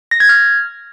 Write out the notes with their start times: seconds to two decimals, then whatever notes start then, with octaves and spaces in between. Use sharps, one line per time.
0.11 A#6
0.20 G#6
0.29 F6